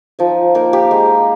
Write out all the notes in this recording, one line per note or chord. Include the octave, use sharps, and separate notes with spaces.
F3 D#4 D#5
A#3 D#4 A#4
G4
G#3